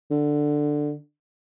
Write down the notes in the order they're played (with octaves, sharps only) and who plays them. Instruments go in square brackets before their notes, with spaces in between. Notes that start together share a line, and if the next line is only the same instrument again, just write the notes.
[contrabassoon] D3